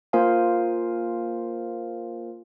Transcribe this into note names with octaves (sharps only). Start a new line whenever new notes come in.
A#3 F4 A#4 C5 F5 G#5